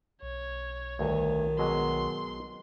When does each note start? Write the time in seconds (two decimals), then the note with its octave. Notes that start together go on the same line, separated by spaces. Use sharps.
0.22 B1 C#5
0.99 D2 G2 D#3
1.59 B2 F#3 G#3 C6